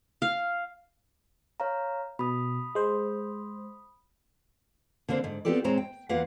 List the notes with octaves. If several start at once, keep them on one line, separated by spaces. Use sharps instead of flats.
F5
C#5 F5 A#5
B2 B5 D#6
G#3 C5
D3 A#3 C4 D4 C5
G#2 D3
B3 C4 F4 G4 A4 D5
A#2 G#3 C4 C#5 A#5
G5
E2 A#3 F4 B4 F5 F#5